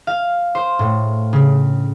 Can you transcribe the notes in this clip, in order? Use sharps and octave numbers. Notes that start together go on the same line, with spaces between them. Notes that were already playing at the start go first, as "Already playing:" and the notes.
F5
C5
A2
C#3